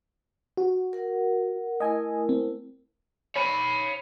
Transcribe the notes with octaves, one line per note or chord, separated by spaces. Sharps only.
F#4
A#4 F#5
A3 E4 A#4 D#5 G#5
C4
C#5 B5